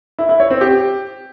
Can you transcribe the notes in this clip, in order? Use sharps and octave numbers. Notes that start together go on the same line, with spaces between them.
E4
E4
C#5
C4
G4